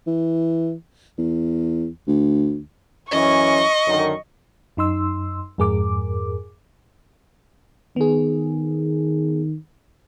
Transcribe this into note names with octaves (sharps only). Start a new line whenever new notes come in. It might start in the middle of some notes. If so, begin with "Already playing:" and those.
E3
E2
D2
F#2 E3 C#4 D#5 C#6
F#2 D3 D#3
F#2 D#4 C6 E6
F2 G#2 G#4 A#4 D6
D#3 B3 G#4